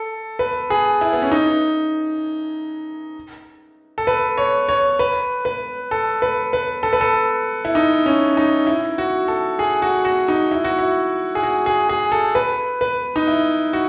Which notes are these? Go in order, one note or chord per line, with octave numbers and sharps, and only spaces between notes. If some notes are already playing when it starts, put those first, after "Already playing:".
Already playing: A4
B4
G#4
E4
B3
C#4
D#4
A4
B4
C#5
C#5
B4
B4
A4
B4
B4
A4
B4
A4
E4
D#4
C#4
D#4
E4
F#4
A4
G#4
F#4
F#4
D#4
E4
F#4
E4
G#4
F#4
G#4
G#4
A4
B4
B4
D#4
E4
F#4